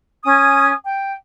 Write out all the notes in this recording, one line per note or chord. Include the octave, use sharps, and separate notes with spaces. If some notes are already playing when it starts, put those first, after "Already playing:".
C#4 G#5 D#6
G5